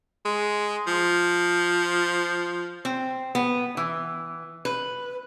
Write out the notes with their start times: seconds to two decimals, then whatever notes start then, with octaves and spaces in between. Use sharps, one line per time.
0.25 G#3
0.87 F3
2.85 C4
3.35 B3
3.77 E3
4.65 B4